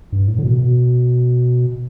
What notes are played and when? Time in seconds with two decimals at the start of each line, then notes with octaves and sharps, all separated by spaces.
0.12 G2
0.28 A2
0.38 D3
0.43 B2
0.58 B2